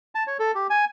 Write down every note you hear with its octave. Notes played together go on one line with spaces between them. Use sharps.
A5
C#5
A4
G4
G#5